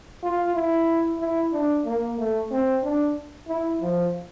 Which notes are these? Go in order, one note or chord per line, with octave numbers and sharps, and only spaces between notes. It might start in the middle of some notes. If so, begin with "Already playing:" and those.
F4
E4
E4
D4
A#3
A3
C4
D4
E4
F3